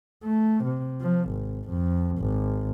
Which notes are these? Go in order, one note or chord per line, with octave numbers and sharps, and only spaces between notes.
A3
C3
F3
G#1
F2
G#1